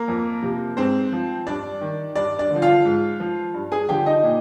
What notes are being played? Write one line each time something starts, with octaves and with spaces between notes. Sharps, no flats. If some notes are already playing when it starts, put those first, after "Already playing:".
Already playing: A#3 A#4
F2
C3 F3
G#2 C4 C5
F3
G2 D4 D5
D#3
G2 D4 D5
D4 D5
D3 F3
F4 F5
G#2
F3
G2
G#4 G#5
D3 F3 G4 G5
D#4 D#5
A#2